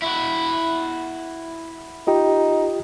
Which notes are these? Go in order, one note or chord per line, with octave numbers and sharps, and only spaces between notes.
E4 F#4
D#4 F4 G4 G5